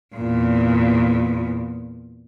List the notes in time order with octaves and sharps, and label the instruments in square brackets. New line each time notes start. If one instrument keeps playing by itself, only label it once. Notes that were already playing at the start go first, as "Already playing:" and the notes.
[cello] E2 A#2